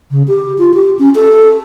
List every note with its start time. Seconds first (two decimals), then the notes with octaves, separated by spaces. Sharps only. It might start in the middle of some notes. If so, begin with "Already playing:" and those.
0.11 C#3
0.28 G4
0.59 F4
0.74 G4
0.99 C#4
1.15 A4